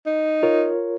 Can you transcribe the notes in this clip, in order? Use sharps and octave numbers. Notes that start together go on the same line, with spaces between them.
D#4
F4 A#4 C#5